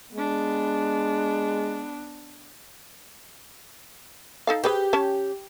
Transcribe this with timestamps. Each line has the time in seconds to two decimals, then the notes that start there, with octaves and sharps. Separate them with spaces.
0.15 G#3 B3 D4
4.47 D#4 A4 F5
4.64 G4 G#4 B4 C5
4.93 C#4 C#5 A5